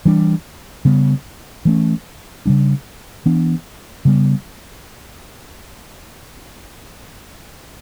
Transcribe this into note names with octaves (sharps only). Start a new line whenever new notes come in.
E3 G3 D4
C#3 G3 B3
E3 A3 C#4
C#3 G3 D4
E3 B3 D4
C#3 G3 B3